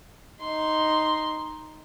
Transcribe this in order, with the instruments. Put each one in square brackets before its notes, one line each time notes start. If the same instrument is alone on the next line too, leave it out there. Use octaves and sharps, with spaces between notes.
[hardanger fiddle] D#4 C6